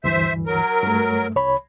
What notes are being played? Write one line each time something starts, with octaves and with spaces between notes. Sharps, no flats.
D2 G2 E3 C5 E5
F#3 A#4
G2 A3
C2 C#5 B5